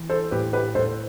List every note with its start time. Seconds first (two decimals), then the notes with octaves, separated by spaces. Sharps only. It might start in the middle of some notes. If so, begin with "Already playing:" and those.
Already playing: E3
0.10 A4 C5
0.31 A2 G4 B4
0.53 G4 B4
0.75 A2 A4 C5